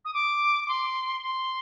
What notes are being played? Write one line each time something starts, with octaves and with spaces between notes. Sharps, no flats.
D#6
D6
D6
C6
C6